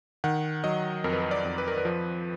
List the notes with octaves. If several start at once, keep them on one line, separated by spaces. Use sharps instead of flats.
D#3 F#5
F#3 D#5
F2 A#4
B4
A#4
D5
F2
B4
A#4
B4
F3